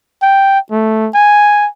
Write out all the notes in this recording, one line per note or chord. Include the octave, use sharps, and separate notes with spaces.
G5
A3
G#5